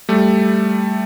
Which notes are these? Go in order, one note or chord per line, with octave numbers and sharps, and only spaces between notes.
G3 A3